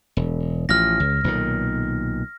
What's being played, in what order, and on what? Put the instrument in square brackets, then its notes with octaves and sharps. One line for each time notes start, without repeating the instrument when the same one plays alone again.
[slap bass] E1
[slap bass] A1 F3 [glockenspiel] F6 A#6
[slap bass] C#2
B1 A#2 D#3